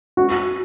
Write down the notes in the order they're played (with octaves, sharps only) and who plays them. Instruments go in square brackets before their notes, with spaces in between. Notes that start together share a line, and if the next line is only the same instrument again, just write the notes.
[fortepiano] F#4